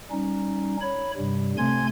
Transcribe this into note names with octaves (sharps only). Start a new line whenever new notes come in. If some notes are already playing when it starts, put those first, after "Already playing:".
G3 C#4 D#4
C#5 B5
G2 C3 G3
C3 A3 G#5 C6 G#6